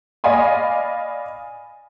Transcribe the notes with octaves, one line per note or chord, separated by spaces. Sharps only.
D5 D#5 F5 G#5 B5